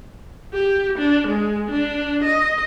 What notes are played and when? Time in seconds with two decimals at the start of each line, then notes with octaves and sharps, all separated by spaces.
0.53 G4
0.98 D4
1.27 G#3
1.70 D4
2.24 D#5